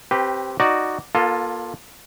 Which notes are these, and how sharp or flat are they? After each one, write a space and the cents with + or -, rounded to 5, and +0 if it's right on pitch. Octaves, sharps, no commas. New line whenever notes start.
C4 +15 G4 -5 B4 +0
D#4 +0 F#4 +0 D5 +0
A#3 +35 F4 +10 A4 +10